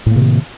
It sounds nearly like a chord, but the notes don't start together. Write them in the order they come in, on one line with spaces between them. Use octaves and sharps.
A2 A#3 C3 D#3